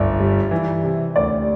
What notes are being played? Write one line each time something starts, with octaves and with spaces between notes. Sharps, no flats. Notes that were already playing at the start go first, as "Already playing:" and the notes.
Already playing: G1 D5 E5
G3
E3
C3
D2 D5